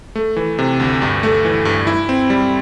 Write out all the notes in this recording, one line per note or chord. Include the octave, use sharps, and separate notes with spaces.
A3
E3
C3
D2
G2
A3
E3
G2
E4
C4
G3